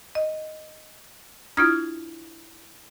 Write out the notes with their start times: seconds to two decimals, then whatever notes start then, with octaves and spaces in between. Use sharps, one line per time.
0.15 D#5
1.57 D4 E4 F4 D#6 F6 G#6